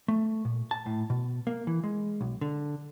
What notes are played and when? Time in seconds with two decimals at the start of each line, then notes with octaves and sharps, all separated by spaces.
0.08 A3
0.45 A#2
0.71 A5
0.86 A2
1.10 B2
1.47 A#3
1.67 E3
1.84 G#3
2.21 B1
2.41 D3